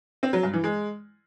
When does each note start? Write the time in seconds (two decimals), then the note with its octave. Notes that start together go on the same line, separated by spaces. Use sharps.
0.23 C4
0.33 F#3
0.43 G2
0.53 E3
0.64 G#3